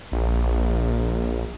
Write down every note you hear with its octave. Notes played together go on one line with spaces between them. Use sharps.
A#1